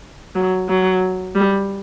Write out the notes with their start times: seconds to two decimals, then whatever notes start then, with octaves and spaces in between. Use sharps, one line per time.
0.35 F#3
0.69 F#3
1.35 G3